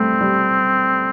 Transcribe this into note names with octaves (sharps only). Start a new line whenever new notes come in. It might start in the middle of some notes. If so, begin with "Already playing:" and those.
Already playing: G3 A3 C4
G3